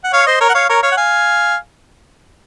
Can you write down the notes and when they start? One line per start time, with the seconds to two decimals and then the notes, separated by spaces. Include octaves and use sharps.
0.04 F#5
0.13 C#5 F5
0.27 C5 D#5
0.41 A#4 C#5
0.49 F#5
0.54 C#5 F5
0.69 A#4 C#5
0.83 C#5 F5
0.92 F#5
0.97 F5 G#5